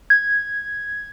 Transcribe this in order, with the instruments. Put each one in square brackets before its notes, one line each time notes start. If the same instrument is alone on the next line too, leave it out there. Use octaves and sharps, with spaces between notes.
[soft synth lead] G#6